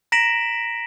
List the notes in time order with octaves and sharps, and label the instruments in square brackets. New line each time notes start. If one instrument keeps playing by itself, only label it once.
[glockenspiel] A#5 A#6 B6 D7 E7 F#7